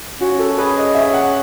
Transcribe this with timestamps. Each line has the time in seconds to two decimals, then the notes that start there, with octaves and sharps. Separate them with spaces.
0.20 C#4 F#4
0.39 A4
0.58 G#4 B4
0.77 D#5
0.94 C#4 E5
1.14 F#5